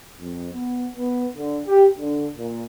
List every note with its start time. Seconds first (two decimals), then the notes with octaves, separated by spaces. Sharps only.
0.21 F2
0.53 B3
0.96 B3
1.36 D3
1.65 G4
1.98 D3
2.37 A#2